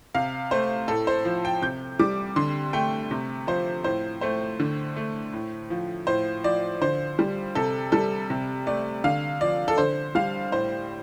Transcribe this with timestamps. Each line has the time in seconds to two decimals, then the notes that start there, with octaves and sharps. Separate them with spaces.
0.15 C3 F5
0.51 A3 C5
0.88 A2 A4
1.07 C5
1.25 F3
1.45 G5
1.62 C3 G6
1.99 G3 D6
2.36 D3 C6
2.73 A3 G5
3.11 C3
3.47 F3 C5
3.84 A2 C5
4.21 A3 C5
4.60 D3
4.96 A3
5.33 A2
5.70 F3
6.07 A2 C5
6.44 F3 D5
6.82 D3 C5
7.19 G3
7.55 C3 A4
7.92 G3 A4
8.30 C3
8.66 A3 D5
9.04 D3 F5
9.41 F3 D5
9.68 A4
9.78 D3 C5
10.15 G3 F5
10.52 A2 C5